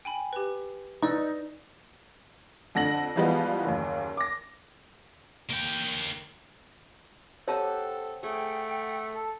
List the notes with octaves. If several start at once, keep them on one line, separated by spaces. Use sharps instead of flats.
G5 G#5 B5
G4 B4
D#4 B4 D5 E6
F2 D3 A#6 F#7
E3 F3 G3 G#3 B3 F4
F#1 D#2
D6 A#6
A#3 G5
C4 G4 A4 C#5 F#5 A5 A#5
A3 G#4 F#5 G5
A4